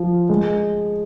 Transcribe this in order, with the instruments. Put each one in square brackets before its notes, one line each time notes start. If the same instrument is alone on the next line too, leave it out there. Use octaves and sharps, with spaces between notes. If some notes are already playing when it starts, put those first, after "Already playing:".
Already playing: [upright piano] F3
G#3